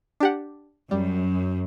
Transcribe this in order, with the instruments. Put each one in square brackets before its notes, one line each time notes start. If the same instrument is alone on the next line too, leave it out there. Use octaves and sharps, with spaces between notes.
[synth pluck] D4 G4 F#5
[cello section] F#2 [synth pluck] G3